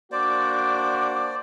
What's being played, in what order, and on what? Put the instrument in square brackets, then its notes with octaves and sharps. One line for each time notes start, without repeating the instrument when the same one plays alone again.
[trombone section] A#3 D4 F#4 [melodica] C5 D5 [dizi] D6